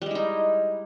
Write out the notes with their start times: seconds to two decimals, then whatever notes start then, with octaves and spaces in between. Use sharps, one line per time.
0.02 G3
0.06 G#3
0.11 E4
0.15 D#4